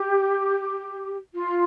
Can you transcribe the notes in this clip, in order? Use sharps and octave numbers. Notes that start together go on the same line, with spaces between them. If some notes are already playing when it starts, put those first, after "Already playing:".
Already playing: G4
F4